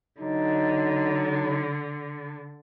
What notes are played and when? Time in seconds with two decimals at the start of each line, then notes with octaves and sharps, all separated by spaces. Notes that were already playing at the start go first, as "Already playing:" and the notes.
0.20 D3 F#3 D#4